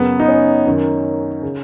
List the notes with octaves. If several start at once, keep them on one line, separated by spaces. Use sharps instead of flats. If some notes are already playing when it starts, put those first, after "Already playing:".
Already playing: F#2 C#3 B3
D#4
C#4
F#2 D#3
C#3